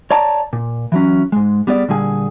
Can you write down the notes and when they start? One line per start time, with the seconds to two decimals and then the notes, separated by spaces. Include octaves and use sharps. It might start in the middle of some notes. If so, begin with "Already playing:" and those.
0.11 C#5 D5 A5 A#5
0.53 A#2
0.92 E3 F#3 C#4
1.32 G#2 G#3
1.67 G3 B3 G#4 D5
1.88 A#2 D3 G3 G#4 G#5